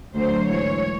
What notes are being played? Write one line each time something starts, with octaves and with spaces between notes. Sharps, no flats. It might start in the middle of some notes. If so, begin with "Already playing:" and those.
D2 D3 F#3 C5
G#2 E3 C#5